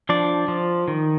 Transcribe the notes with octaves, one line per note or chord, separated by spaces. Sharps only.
F3 D4 D5
F3
D#3